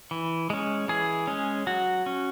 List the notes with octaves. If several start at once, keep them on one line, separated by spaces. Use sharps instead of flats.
E3
G#3 C#4
E3 G#4
G#3 C#4
F#3 F#4
C#4